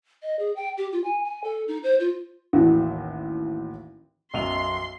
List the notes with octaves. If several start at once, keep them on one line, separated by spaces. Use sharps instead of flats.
D#5
G#4
G5
G4
F4
G#5
G#5
A4
D#4
C5
F4
A1 D#2 D#3 E3 F#4
B1 F#2 C6 F7